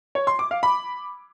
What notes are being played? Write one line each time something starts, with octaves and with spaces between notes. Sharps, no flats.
C#5
C6
D6
F5
B5